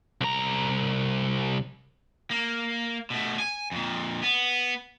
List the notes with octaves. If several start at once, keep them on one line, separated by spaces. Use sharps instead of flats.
C2 A#5
A#3
B2 A3
G#5
F2 A#2
B3